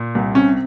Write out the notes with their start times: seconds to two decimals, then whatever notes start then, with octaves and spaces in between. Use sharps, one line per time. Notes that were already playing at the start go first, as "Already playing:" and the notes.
Already playing: A#2
0.15 C2
0.35 C3 C#4